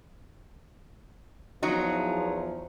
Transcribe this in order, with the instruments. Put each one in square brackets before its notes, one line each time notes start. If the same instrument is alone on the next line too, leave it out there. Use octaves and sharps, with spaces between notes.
[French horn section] E2 F3 [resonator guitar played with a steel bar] F#3 D#4